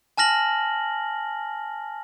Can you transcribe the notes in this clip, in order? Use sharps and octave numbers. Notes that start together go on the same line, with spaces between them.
G#5 A5 F6 A#6 F#7